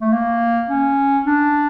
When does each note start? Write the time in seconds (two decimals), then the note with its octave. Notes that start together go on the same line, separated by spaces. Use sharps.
0.01 A3
0.12 A#3
0.69 C#4
1.26 D4